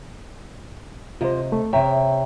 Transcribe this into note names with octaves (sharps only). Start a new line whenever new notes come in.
C3 F4 C5 D#5
A3
C3 C#5 E5 G5 A#5